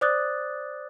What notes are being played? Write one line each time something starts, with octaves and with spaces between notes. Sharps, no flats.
C5 D5 D6 D#6 F#6 A6